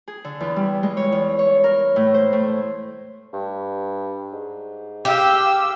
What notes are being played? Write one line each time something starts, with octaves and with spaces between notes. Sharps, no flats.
G#4
D3
E2
G3
G#3
C#5
E2
C#5
A#4
A2
C5
A2
G2
G#2
G4 F5 E6